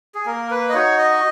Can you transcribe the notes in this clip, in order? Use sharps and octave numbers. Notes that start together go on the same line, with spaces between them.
G#4
A#3 A#4
B4
D#5
D#4 F#4 C#5
D#5